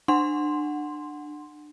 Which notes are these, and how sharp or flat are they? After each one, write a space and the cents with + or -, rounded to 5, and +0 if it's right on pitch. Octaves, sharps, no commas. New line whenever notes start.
D4 +30 F#5 -5 C6 +0